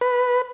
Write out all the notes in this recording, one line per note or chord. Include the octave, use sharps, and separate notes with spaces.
B4